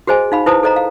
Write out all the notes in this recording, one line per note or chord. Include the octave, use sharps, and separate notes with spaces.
F#4 G#4 C5 D#5 G#5
D#4 F5 B5
E4 B4 C5 A5 D#6
A4 C5 D#5 A#5
F5